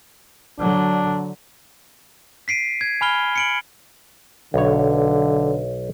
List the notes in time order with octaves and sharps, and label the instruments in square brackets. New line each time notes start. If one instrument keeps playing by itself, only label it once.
[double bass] D3 F#3 [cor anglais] D4
[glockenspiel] B6 C7 D7 D#7
G#6
G#5 B5 F6 G7
C#7 D7 F#7
[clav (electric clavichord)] B1 C#5 [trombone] D3